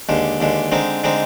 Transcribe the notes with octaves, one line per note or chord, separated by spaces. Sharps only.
D#2 D3 G#3
D#2 D3 G#3
D3 G#3 C4 D#4
D3 G#3 C4 D#4